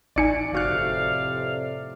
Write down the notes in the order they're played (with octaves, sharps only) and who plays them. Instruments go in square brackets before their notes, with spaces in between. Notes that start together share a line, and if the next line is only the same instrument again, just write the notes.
[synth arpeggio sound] A1 D#4 G#5 [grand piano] D5 C#7
[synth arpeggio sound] G1 F#4 F#6 [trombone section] F2 A2 C3 [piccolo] F5